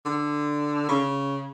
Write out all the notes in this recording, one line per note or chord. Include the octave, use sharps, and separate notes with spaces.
D3
C#3